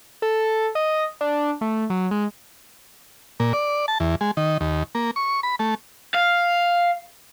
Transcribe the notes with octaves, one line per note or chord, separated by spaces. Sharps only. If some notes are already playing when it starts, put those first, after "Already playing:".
A4
D#5
D4
A3
F#3
G#3
A#2
D5
A5
E2
G#3
D#3
D#2
A#3
C#6
B5
A3
F5